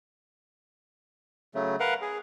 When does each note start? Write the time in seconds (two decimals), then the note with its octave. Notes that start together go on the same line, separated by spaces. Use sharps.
1.55 C#3 F#3 A3
1.80 A#4 B4 F5 F#5
2.02 G#4